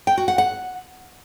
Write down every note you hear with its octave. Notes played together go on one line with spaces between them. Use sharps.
G5
F#4
F#5
F#5